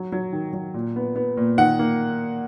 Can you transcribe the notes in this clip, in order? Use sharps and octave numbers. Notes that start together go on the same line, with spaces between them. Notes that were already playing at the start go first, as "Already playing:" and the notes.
Already playing: F#3
F#3
D#3
F#3
A#2
B3
B3
A#2
D#3 F#5
A#3